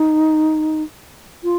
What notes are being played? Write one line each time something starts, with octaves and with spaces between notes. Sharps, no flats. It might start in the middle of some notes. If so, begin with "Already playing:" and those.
Already playing: D#4
F4